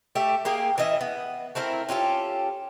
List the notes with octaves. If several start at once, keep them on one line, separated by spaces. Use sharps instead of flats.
A3 G4 E5
A#3 G4 G#4
E3 C#4 D#5 E5
B3
A3 C4 E4 A#4
C#4 F4 G4 A4